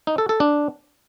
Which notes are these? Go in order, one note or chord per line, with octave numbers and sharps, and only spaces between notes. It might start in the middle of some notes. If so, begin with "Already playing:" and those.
D#4
A4
A4
D4